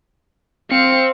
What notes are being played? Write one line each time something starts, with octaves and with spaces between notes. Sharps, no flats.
C4 F5 C#7